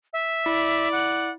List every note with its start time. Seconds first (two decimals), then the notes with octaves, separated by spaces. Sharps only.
0.13 E5
0.46 E4 D5
0.92 F#5